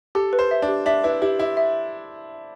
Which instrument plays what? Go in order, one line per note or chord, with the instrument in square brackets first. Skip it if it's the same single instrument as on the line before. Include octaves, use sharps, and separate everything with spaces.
[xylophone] G4 [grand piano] A4
[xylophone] B4
[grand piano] C5
[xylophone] E5
[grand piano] D4
[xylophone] G4
[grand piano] D4 [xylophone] E5
[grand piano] E4 [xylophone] B4
[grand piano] E4 [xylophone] G4
[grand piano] E4 [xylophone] E5
[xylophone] E5